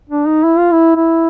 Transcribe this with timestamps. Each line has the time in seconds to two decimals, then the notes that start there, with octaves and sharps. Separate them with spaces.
0.09 D4
0.27 D#4
0.44 E4
0.58 F4
0.72 E4
0.96 E4